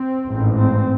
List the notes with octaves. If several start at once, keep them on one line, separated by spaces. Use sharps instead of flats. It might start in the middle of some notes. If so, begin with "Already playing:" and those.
Already playing: C4
A1 G#2
C4